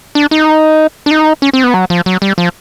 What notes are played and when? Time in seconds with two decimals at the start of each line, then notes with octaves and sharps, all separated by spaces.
0.15 D4
0.31 D#4
1.06 D4
1.11 D#4
1.42 C#4
1.53 C4
1.64 B3
1.74 F#3
1.90 F3
2.06 F#3
2.22 G3
2.38 F3